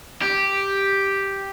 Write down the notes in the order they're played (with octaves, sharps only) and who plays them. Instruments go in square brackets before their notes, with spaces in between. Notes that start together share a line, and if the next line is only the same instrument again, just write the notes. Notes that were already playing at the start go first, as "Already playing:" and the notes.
[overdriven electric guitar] G4